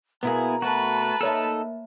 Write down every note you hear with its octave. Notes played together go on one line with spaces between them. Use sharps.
B2 A#3 B3 E4 G#4 A#5
A3 F#4 B4 A5
A#3 D#4 A4 C#5 E5